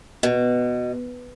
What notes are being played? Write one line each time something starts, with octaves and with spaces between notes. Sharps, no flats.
B2